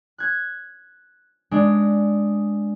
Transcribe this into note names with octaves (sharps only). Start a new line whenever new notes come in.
F#6 G#6
G#3 D4